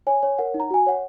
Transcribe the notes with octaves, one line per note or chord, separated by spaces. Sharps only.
C#5 G#5
C#5
A#4 F#5
D#4
A#5
F#4 G#5
C#5 F#5